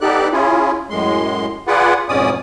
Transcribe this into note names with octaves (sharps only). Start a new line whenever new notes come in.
B3 D#4 G4 A4 D5 F#6
C#4 E4 F4 G#4
F#2 A2 G#3 C6
F4 G#4 B4 D5 F#5
F2 G#2 B2 C#4 D5 D#6